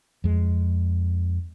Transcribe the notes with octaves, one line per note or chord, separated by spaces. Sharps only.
F2 G#3